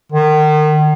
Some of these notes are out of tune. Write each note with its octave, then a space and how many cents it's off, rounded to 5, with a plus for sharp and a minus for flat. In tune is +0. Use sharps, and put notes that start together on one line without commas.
D#3 -35